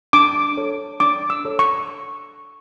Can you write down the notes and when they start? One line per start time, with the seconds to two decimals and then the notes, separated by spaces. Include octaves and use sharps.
0.13 D4 D6
0.57 A4 C#5
1.00 D4 D6
1.30 E6
1.45 A4 C#5
1.59 C#6